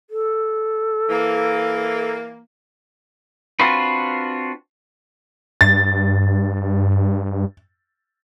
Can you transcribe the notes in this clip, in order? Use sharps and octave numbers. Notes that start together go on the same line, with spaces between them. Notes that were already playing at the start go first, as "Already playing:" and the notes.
A4
E3 A#3
C4 D4 F4 F#4 B4
G2 A6